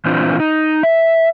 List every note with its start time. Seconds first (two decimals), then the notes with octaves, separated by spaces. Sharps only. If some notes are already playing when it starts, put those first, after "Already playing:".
0.05 A#2 E3 C4 D4 F4
0.40 D#4
0.83 E5